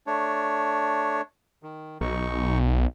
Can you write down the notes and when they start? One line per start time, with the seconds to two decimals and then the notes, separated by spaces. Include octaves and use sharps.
0.07 A3 D4 C#5
1.63 D#3
2.01 B1 D#4 C#6